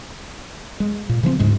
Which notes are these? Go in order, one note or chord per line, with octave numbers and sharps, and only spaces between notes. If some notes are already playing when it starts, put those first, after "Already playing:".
G#3
A#2
C#3 F3 A#3 C4
D2 G#2 G#3